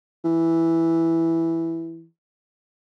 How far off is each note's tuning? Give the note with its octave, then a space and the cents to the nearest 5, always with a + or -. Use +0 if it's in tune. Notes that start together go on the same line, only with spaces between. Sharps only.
E3 +0